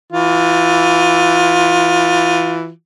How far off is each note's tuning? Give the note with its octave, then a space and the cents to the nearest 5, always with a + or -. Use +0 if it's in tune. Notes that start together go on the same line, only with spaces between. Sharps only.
E3 +0 F4 +25